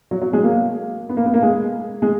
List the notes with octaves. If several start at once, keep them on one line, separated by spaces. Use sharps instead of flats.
F#3
F#3
G#3
A#3
B3
A#3
B3
A#3
G#3
G#3